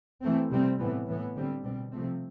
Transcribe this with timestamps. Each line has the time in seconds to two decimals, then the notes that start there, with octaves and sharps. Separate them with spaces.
0.22 E3 A3 C4
0.50 C3 G3 C4
0.79 A2 E3 B3
1.06 A2 E3 B3
1.35 D3 G3 C4
1.63 B2 G3 C4
1.92 C3 F3 A3 C4